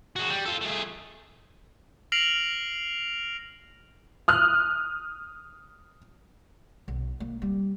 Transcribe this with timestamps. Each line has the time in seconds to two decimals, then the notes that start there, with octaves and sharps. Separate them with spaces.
0.16 G#3 F#4
0.30 G3
0.45 F4 A4
0.61 A3 G#4
2.12 F6 A#6 C7 D7 F7 F#7
4.28 D#6 F6 F#6
6.88 B1
7.20 A#3
7.42 G3